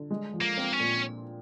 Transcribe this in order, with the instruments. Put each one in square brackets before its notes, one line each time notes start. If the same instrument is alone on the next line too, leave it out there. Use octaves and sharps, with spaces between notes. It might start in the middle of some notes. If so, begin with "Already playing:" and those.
Already playing: [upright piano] D3
G#3
F3
[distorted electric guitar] A#3
[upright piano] C4
[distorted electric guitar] C#4
[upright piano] A#2